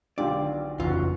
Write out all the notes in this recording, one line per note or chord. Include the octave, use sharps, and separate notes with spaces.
B1 D3 D#3 D4 F4 G4 D5
F1 C#3 E3 F4 F#4